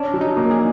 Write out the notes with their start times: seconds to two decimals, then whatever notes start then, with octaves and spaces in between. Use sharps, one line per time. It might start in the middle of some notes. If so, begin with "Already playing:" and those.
Already playing: C#4 D4
0.14 F#3
0.21 D#4
0.37 A#3
0.51 G#4